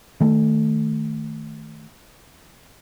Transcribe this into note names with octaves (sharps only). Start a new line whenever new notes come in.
D#3 A3